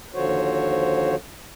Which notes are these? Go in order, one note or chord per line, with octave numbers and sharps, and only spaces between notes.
D#2 D3 F3 F#4 C5 C#5